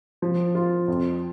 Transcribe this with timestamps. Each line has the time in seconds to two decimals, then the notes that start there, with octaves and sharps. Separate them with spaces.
0.22 F3
0.55 F4
0.88 F2